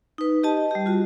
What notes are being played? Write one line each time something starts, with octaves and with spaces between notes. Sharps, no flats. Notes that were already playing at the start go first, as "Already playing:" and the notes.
D#4 B4
G4 D#5 A5
G3 G4
F4 F#4